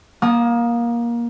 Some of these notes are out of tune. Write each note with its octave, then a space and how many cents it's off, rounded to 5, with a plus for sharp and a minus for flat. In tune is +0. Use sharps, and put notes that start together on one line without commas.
A#3 +20 A5 -25 D#6 -10